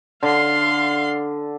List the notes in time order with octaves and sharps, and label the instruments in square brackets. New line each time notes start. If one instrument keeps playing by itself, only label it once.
[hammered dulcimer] D3 [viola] F5 C6